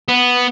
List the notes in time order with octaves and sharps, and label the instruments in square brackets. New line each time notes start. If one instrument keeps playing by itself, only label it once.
[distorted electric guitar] B3